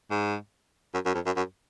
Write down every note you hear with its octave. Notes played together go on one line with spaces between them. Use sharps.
G#2
F#2
F#2
F2
F#2
F#2